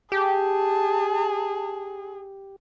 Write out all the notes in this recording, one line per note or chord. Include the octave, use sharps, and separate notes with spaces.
G4 G#4 A5